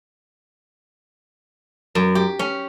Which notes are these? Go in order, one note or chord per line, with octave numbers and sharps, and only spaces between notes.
F#2
G4
C#4